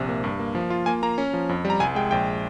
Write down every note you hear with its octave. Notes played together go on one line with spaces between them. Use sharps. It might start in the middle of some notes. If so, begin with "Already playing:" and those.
Already playing: A#1 C3
A#3
G2
A#3
F3
F4
A#3 G#5
A#3 A#5
C#4
F3
F2
G3
A#5
C2 G#5
G#3 G5
A#1 G5